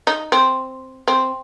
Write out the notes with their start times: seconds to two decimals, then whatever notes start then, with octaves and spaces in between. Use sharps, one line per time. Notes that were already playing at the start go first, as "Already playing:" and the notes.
0.07 D#4
0.32 C4
1.08 C4